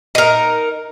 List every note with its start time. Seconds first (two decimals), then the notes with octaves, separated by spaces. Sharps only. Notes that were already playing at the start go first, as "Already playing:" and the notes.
0.15 D#4 A#4